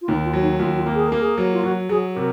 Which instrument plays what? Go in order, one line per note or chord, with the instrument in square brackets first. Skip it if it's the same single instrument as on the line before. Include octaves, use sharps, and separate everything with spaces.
[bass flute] F4
[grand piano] D#2 [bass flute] D#4
[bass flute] F4
[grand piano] F#3
[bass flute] D#4
[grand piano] D#2 [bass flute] F4
[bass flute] F4
[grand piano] A#3
[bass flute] G#4
[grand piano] A#3 [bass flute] A#4
[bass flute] G#4
[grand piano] F#3
[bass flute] F4
[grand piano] F#3 [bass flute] F#4
[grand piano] F#3 [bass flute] G#4
[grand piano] C3 [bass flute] A#4